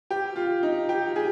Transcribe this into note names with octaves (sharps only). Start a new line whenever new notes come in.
G4
F4
D#4
G4
G#4